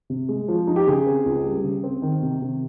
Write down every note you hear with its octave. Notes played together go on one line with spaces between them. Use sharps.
C3
G#3
F3
D#4
G4
C#3 G#4
C4
C#2
G3
C#3
C4
D#3
C3
C3